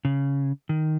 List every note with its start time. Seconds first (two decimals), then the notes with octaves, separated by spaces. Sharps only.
0.05 C#3
0.69 D#3